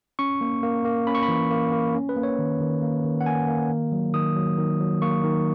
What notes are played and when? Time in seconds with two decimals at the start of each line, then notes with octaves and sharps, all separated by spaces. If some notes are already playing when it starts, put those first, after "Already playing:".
0.19 C#4 C#6
0.41 A#3
0.63 A#3
0.85 A#3
1.07 C#4 B5
1.15 C#6
1.23 B5
1.28 E3
1.51 A#3
1.72 A#3
1.95 C#4
2.09 B4
2.17 A#3
2.23 C#5
2.39 D#3
2.60 D#3
2.82 A#3
3.04 D#3
3.21 F#5
3.26 A#3 G#5
3.48 A#3
3.70 D#3
3.92 F#3
4.14 D#3 D#6
4.36 F#3
4.58 D#3
4.80 F#3
5.02 A#3 C#6
5.24 D#3